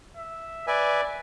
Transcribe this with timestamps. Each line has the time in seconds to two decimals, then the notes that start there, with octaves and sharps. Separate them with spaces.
0.17 E5
0.67 B4 D5 E5 G#5